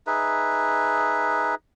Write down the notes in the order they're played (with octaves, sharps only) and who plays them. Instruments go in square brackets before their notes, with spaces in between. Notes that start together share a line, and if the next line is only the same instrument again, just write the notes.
[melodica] D#4 G#4 B4 E5